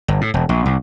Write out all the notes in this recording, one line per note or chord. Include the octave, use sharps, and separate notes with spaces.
G1
A2
E1
A#1
C2